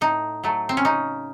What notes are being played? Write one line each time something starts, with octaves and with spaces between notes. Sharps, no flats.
A2 D#4
F#3 A3
C4
C#4
C#3 D#4